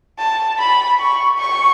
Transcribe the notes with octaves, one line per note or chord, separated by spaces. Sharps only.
A5
B5
C#6
C#6